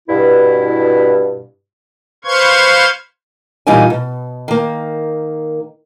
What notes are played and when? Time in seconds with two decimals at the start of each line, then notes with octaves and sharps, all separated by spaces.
0.09 G2 B2 E4
2.25 B4 C5 F5 C6 C#6 G#6
3.67 A#2 E3 G3 D#4 F4 G#5
3.90 B2
4.48 D#3 A#3